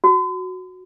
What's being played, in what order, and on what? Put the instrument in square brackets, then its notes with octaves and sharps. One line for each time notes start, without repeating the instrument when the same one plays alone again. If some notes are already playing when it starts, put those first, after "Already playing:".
[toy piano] F#4